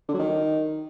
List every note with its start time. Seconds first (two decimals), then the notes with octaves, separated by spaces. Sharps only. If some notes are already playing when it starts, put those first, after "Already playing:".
0.09 D3
0.14 F#3
0.19 D#3